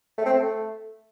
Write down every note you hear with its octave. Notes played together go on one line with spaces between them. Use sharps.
A3
C4
A3